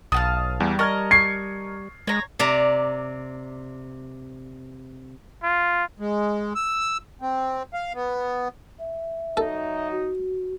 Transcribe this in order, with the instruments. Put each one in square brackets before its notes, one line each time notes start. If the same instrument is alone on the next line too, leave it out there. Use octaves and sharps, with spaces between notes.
[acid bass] B1 [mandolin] F5 F#5 A5 [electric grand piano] D#6
[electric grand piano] E2 [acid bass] G3
[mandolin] A#4 D#5 A5 [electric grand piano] C#6 F6 G#6
[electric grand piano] C#6 G#6 C#7 [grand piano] C7
[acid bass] G#3 [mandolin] C#5 A#5
[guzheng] C3 D5 A#5
[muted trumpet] F4
[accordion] G#3
E6
C4
F5
B3
[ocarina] E5
[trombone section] F#3 D#4 [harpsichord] A4
[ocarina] F#4